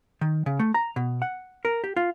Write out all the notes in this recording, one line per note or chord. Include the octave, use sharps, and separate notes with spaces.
D#3
C#3
A3
A#5
B2
F#5
A#4
G4
F4